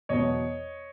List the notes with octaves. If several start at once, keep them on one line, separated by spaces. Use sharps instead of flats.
E2 B2 F#3 B3 C#5 D#5